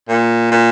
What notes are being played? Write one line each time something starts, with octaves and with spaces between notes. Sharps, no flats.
A#2
A#2